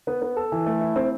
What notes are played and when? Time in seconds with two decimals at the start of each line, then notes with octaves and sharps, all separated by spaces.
0.07 B3
0.22 B3
0.37 A4
0.52 E3
0.66 A3
0.81 E4
0.96 C4